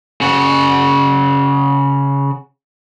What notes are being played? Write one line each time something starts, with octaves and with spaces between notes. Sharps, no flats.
C#3 F#4